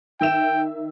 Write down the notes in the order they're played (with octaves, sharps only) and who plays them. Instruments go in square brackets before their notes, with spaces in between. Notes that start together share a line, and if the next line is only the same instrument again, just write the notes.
[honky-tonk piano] D#3 E5 E7 [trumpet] G5